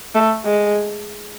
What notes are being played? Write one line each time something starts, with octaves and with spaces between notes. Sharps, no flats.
A3
G#3